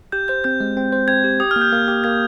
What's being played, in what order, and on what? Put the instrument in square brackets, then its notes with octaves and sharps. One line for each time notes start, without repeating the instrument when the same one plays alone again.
[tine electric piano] G4 [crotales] G6
[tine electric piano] C5 [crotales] G6
[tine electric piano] C4 [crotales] G6
[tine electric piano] G#3
C4
C5
[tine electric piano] C4 [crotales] G#6
[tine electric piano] G4
[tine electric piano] G4 [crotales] D#6
[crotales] F6
[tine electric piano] A#3
[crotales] G6
[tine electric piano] A#3
G4
[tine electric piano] A#3 [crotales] G#6